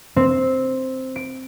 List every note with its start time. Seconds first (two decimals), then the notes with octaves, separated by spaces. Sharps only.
0.16 C4
1.16 D7